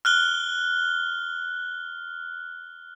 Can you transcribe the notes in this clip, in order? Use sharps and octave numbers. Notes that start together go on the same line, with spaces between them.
F6 F#6 G7